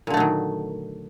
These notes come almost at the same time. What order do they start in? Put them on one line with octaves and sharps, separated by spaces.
A#2 D3 A3 F#3 D#3